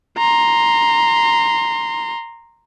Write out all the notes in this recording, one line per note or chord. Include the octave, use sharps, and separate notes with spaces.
A#5 C6